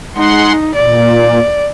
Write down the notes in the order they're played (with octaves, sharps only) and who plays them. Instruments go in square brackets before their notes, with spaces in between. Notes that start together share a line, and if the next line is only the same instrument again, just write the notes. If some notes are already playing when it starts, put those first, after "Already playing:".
[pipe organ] G#3 F#5 C6 [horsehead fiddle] D#4
[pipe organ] A#2 [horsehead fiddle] D5